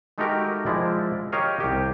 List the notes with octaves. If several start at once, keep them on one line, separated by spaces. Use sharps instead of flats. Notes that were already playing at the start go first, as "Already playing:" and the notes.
G#3 A3 D#4 F#4 G4 A#4
F3 G#3 E4 D5
G4 A#4 C#5 D#5 F5
C2 G4